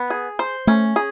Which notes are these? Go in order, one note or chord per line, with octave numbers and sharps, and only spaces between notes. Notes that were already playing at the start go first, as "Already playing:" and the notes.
Already playing: B3
G#4
C5
A3 C#4
G#4